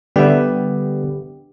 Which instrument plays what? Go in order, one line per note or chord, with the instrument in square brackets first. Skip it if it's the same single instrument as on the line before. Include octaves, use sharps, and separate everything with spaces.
[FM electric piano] D3 G3 G4 [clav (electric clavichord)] B3 E5